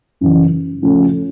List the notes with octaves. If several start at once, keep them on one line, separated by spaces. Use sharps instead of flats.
F#2 C#3 E3
C#3 F3 A3 C#4